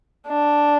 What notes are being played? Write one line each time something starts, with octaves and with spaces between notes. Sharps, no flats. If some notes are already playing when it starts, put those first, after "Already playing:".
D4